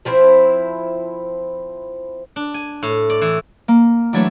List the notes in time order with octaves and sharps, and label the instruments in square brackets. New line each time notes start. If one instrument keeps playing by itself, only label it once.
[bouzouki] F3 C4 E4 C5
[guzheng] D4
G#5
A2
D5
E3
[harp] A#3
E3 F#3 A3 D4 A4 C#5